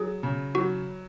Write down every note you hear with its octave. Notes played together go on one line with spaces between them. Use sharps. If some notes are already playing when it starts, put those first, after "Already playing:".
Already playing: F#3 G#4
C#3
F#3 F#4